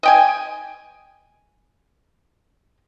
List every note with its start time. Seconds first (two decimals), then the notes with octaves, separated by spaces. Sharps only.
0.03 D#5 G5 G#5